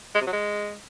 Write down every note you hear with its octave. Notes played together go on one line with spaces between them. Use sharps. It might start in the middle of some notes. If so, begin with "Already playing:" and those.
G#3
C3
F#3
G#3